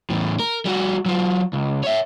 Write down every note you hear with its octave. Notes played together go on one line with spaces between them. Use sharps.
E2 A2
A#4
G3 F#4
F#3 F4
C#2
C#5 E5